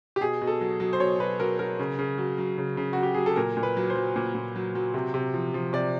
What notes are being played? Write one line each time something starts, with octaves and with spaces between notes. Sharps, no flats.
G4
B2 G#4
B2
A4
F#3
F#3
C5
B2 C#5
B2 B4
F#3 A#4
F#3 A#4
C#3
C#3
F#3
F#3
C#3
C#3
F#3 F#4
G4
F#3 G#4
A4
A#2 A#4
A#2
B4
F#3
C5
F#3
A#2
A#2
F#3
F#3
C3
C3
F3
F3
C3 D5